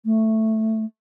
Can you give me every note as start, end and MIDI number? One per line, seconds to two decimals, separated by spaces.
0.05 0.85 57